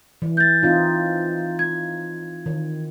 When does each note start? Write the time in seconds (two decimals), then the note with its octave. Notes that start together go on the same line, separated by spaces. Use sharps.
0.22 E3
0.37 G6 A6
0.63 C4 D#4 F4
1.59 G#6
2.46 D#3